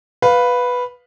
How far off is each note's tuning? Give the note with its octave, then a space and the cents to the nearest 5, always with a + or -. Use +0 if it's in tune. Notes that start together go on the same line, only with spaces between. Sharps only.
B4 +0 F5 +15